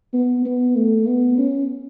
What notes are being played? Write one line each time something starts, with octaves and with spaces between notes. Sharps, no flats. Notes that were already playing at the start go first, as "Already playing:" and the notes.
B3
B3
A3
B3
C#4